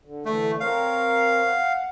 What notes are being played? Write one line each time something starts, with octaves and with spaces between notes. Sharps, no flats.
D3
D3 E3 A3
C4 A#4 C#5 F5
F#5